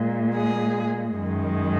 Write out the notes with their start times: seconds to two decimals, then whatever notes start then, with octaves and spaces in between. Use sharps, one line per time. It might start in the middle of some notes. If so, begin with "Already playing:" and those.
Already playing: A#2 G#3
0.35 G#4
1.17 F#2 D#3 G#3